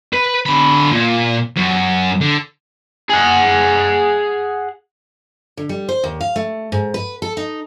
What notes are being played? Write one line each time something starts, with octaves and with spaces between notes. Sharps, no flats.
B4
D3 B5
A#2
F#2
D3
G#4 F#5
D3
G3
C5
D#2
F5
A3
G#2
B4
A4
D#4